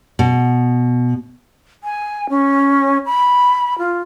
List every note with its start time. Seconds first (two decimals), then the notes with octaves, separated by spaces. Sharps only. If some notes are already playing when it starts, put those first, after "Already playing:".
0.19 B2
1.84 G#5
2.30 C#4
3.06 B5
3.78 F4